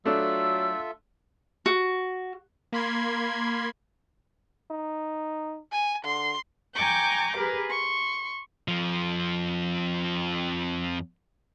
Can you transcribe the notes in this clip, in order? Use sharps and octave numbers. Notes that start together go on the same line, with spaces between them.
F#3 A3 D4 F4 A4 E5 E6
F#4
A#3 B5 C6 G#6
D#4
G#5
D3 C6
G5 G#5 A#5 C#6 D6 G6
G4 G#4 A#4 B4
C6 C#6
F2 F3